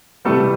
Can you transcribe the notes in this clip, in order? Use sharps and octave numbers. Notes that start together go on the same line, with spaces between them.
C3 E3 G3 A3 A4